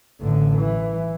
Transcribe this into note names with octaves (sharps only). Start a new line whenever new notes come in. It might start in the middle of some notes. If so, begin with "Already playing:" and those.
A1 D3
E3